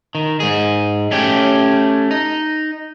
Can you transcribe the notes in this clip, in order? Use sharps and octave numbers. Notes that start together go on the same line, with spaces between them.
D#3
G#2 G#4
A3 C#4 G4
D#4